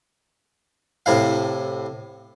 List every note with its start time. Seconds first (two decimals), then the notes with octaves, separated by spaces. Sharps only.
1.06 A2 C3 E4 F5